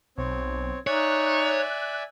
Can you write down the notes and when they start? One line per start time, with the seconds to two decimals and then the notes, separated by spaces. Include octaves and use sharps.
0.18 B1 C4 C#5
0.87 D#4 C#5 D5 E5 G#5 F#6